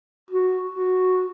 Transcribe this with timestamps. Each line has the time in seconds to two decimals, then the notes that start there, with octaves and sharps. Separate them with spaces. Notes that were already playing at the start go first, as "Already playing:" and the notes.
0.31 F#4
0.70 F#4